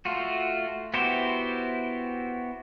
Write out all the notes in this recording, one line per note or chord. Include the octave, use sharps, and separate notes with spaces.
A3 F4 F#4
B3 E4 F#4 G4 C5